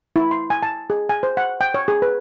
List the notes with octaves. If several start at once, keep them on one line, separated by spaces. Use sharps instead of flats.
E4
C6
G#5
A5
G#4
G#5
C5
F#5
G5
C#5
G#4
B4